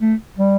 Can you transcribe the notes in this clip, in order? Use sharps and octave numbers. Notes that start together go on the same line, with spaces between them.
A3
G3